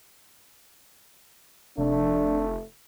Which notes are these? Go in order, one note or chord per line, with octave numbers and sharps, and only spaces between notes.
F1 A3 D4